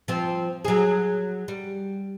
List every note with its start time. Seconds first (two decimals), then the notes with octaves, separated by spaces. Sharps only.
0.08 F3 C4
0.65 F#3 G#4
1.48 G3